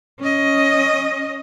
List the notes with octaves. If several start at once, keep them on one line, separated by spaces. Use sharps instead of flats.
C#4 D#5